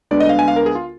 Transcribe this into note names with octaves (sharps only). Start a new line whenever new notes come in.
D2 D3 G#3 B3 D4 D5
D#5
F5
G#5
F5
A#4
G#4
F4